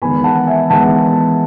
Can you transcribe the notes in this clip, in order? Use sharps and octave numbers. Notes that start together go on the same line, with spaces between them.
E2 D#3 G#3 B3 G#5 B5
F#5 A5
E5 G#5
E2 D#3 G#3 B3 F#5 A5